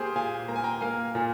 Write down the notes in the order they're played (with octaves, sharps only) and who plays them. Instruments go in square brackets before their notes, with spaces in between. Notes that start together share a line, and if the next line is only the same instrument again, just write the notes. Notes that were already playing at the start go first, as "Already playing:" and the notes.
Already playing: [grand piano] A#3 [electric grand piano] G4 G#4 C5
[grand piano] A#2 [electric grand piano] F5 G#5
[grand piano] A#3 [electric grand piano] A#5
[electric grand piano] G#5
G5 A#5
[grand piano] A#3 [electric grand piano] F5 G#5
[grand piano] A#2